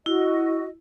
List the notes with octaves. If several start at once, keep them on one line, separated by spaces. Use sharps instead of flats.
E4 F#4 D#5